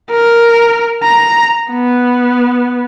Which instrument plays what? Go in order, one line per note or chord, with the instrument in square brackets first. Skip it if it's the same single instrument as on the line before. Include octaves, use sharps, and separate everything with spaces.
[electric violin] A#4
A#5
B3